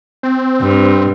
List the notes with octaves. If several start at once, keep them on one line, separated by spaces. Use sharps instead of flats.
C4
G2